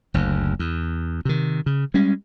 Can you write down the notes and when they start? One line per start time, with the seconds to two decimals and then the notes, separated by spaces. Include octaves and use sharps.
0.14 F#1 D2
0.59 E2
1.25 C3 D#3
1.66 C#3
1.94 G3 G#3 C#4